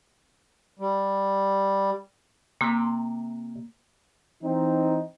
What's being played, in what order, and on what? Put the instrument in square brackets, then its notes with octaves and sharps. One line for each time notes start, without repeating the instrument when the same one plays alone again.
[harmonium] G3
[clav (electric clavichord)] C3 [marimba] A#3
[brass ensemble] E3 C4 D#4